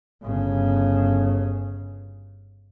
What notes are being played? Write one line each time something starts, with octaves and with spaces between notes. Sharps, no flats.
G1 C#3